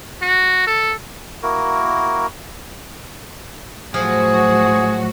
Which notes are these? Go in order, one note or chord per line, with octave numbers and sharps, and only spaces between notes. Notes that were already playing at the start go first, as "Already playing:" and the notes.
F#4
A4
A#3 E4 F#4 A#4
A2 F3 F#3 F#4 G#4